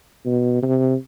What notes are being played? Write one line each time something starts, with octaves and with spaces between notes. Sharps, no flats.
B2
C3